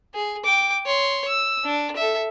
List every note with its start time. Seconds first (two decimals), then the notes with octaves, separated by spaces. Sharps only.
0.14 G#4
0.44 G5 D6
0.86 C#5 C6
1.28 E6
1.64 D4
1.96 A4 E5